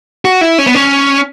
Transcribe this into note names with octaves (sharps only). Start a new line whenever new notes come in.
F#4
E4
C#4
B3
C#4